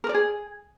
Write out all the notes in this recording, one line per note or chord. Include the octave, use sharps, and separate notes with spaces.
A#4
D5
G#4